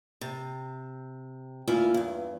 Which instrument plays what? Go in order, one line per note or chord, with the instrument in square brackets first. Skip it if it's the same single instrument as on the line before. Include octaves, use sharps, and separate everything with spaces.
[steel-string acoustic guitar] C3
D2 A#3 E4 F4 E5 G#5
E2 G2